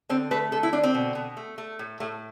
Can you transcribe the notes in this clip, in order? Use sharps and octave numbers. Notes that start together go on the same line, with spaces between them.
D3 C4
A3 B4
D3 A4
E4
D3 D4
C4
B2
B2
A3
A3
A2
A2 A3